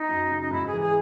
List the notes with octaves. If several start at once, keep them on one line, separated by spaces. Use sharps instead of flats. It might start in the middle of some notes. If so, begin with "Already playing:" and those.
Already playing: D#4
F#2
C#3
D#4
G#2 E4
G#4
E3
G#4